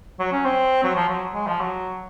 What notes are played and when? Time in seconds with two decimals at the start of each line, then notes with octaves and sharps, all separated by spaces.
0.20 F#3
0.33 C#4
0.45 C4
0.84 F#3
0.96 F3
1.09 F#3
1.34 G#3
1.47 F3
1.60 F#3